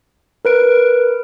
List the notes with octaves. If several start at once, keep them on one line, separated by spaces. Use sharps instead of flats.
A#4 B4 D7